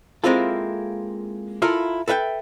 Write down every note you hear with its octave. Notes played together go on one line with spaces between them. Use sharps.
G#3 A#3 C4 E4 F4 A4
E4 F4 A4 A#4
A4 B4 E5 F5 G5